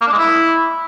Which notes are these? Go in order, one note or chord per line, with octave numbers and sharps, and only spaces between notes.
A#3
D4
G#3
E4